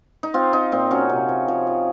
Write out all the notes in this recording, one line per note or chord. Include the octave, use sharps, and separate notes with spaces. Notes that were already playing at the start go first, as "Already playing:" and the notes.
D#4
C4 F4
C4 D#4
A#2 C4
F#3 C#4
C3
F3
F3
F3